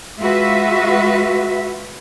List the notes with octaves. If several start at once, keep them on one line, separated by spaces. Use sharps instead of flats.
G#3 F4 F#4 B4 E5